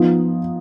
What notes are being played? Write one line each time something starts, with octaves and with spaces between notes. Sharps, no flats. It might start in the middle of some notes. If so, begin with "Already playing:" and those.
Already playing: F3 B3 D#4